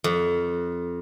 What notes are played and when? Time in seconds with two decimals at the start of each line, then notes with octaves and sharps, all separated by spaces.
0.04 F2